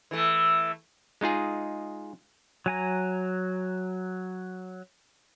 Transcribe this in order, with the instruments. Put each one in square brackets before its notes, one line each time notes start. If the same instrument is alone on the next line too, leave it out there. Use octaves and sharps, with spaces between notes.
[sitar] E3 A3
[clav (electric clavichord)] G#3 D#4 F4 G#4
[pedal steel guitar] F#3 G#5 A#5